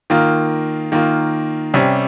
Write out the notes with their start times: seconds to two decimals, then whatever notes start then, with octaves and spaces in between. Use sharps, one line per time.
0.10 D#3 A#3 F4
0.92 D#3 A#3 F4
1.74 C3 G3 C#4